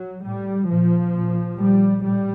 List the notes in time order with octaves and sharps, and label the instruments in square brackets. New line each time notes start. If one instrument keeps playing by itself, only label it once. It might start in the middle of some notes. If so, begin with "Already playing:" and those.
Already playing: [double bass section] F#3
A2 G3
A#2 F3
A#2
A#2 G3
A2 G3